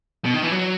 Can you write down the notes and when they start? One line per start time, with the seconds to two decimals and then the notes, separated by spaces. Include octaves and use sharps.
0.25 B2
0.34 D#3
0.43 E3
0.52 F#3